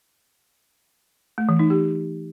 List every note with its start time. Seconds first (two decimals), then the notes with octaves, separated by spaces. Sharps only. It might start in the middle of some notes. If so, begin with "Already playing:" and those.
1.38 A3
1.49 E3
1.59 D#4
1.70 G4